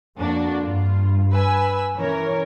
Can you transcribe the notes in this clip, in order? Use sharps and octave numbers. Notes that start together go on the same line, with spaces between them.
F2 A#3 D4 F#4
G2 F4
B4 G#5 E6
E3 C#4 A#4 C#5